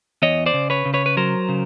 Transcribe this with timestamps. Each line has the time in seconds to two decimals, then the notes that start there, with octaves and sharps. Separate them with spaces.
0.22 E2 C#5 D#5
0.46 C5 D5
0.54 C#3
0.70 B4 C#5
0.85 C#3
0.94 B4 C#5
1.06 B4
1.17 F#3 A#4 C5
1.49 C#3